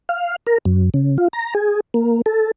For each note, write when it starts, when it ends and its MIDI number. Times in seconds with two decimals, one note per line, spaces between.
0.09 0.36 77
0.47 0.58 70
0.65 0.90 42
0.94 1.17 49
1.18 1.28 65
1.33 1.54 82
1.55 1.80 68
1.94 2.22 58
2.26 2.51 69